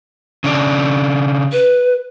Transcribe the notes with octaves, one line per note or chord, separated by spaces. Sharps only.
C#3 D4
B4